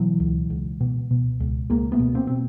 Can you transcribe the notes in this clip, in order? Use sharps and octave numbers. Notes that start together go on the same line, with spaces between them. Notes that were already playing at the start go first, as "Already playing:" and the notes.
Already playing: B2 E3 F#3
C#2
C#2
B2
B2
C#2
C#2 G#3 A#3
A3 B3
B2
A#3 C4
B2 C4